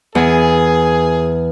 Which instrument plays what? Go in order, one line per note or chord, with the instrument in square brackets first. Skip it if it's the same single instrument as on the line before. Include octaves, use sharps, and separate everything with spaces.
[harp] E2 [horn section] G#4